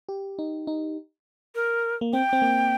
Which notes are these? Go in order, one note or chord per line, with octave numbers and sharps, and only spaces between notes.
G4
D#4
D#4
A#4
A#3
C4 G5
C4
A#3